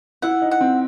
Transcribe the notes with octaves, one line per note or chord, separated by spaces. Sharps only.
E4 F#5
D#4
F#5
C4